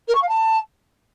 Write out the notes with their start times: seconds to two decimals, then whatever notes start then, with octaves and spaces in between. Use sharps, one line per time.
0.08 A#4
0.15 C#6
0.22 F5
0.29 A5